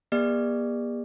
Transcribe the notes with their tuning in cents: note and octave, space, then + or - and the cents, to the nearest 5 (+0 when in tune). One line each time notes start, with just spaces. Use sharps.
A#3 +45 G#4 -45 D5 +25